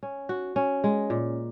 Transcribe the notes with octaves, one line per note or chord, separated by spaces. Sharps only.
C#4
F#4
C#4
G#3
A#2